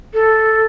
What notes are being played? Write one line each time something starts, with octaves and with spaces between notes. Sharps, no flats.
A4